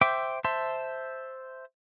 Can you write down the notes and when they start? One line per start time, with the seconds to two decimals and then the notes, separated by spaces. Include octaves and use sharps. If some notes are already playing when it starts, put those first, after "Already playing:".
0.01 C5 E5 G5 D6
0.44 C5 E5 A5 C6